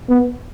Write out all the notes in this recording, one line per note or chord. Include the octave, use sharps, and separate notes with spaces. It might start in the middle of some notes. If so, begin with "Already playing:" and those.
B3